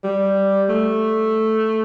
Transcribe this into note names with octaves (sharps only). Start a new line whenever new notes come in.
G3
A3